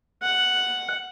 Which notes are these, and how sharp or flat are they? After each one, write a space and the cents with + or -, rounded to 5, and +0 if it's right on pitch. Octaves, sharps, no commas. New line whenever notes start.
F#5 +0